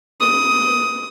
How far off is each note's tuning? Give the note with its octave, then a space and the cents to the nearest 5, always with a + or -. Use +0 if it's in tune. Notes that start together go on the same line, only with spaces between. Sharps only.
D#6 +15